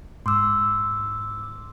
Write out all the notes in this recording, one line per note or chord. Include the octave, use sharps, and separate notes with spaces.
G#2 C6 D6 E6